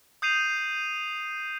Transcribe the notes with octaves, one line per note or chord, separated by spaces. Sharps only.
D#6 G6 C7 D#7 F7